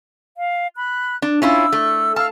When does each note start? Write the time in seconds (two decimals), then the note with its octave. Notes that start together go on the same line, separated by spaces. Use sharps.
0.37 F5
0.75 B5 F#6
1.22 D4
1.42 C#4 E4 F4 E6
1.73 A3
2.16 F5 A5 E6 F6